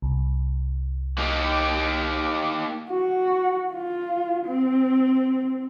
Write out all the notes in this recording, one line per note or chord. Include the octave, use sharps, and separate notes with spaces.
C2
A#3 D#4 G4
F#4
F4
C4